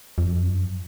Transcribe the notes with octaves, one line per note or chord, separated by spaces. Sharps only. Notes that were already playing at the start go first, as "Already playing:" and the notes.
F2
F#2